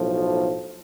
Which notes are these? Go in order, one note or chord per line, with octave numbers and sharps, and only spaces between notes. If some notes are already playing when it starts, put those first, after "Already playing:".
Already playing: B1 A2 F3